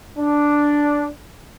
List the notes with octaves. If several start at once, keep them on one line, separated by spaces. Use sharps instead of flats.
D4